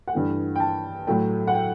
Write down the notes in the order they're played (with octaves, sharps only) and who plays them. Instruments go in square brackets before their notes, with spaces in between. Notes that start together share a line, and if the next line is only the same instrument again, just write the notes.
[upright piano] F#5
G2 E3 A3 G5
G5
A5
A2 F#3 A3 G5
F#5
G5